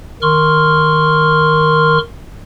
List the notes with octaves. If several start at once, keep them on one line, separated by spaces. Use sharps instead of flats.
D#3 A#4 C6 C#6 F6